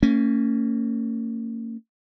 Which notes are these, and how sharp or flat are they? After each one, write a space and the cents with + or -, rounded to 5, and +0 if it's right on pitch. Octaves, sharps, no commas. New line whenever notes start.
A#3 -40 C#4 +0